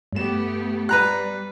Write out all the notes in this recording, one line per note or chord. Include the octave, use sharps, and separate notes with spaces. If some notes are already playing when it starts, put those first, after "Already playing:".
G2 A3 B3 G4 E7
G3 B4 A#5 F#6